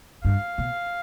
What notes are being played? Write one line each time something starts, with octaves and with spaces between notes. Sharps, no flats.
G2 F5
B2